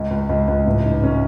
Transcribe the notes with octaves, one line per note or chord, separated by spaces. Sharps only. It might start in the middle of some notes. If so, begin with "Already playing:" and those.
Already playing: C#2
C#2
C#2
C#2
A1
G#2
C#4